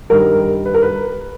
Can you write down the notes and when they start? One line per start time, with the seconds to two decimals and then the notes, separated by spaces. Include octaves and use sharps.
0.10 G2 D#3 G3 A#4
0.65 B4
0.74 A#4
0.82 B4